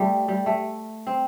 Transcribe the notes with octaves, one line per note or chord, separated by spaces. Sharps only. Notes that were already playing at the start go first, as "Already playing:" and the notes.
Already playing: G3 A3
G3
A3
C4